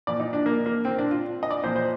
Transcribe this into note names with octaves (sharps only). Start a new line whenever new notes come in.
A#2 F3 D5
D#4
D4
A#3
A#3
C4
D4
F4
D#5
D5
A#2 F3 C5
C5